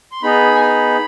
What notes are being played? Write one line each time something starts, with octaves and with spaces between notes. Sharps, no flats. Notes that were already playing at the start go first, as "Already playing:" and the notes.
C6
B3 D#4 G#4 B5
G#5
B5